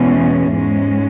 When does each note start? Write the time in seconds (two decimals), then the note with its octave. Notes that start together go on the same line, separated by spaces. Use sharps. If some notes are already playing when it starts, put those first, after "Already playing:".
Already playing: E2 B2 G#3 C#4
0.54 G#2 G#3 C#4